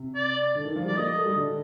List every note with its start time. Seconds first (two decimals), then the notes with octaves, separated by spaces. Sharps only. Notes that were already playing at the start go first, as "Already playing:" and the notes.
Already playing: C3
0.15 D5
0.55 D3
0.65 D#3
0.76 F3
0.85 G3 D5
0.95 A#3 D#5
1.15 A3
1.26 G3
1.35 D3